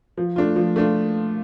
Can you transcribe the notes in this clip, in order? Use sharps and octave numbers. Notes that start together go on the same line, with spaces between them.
F3
A3 D4 F4
F3
A3 D4 F4